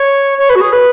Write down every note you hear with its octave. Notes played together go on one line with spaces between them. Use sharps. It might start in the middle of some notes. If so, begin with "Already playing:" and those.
Already playing: C#5
C#5
B4
F#4
G#4
B4